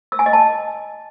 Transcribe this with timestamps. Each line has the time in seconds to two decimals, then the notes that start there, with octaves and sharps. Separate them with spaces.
0.12 E6
0.19 G#5
0.26 D#5
0.33 A5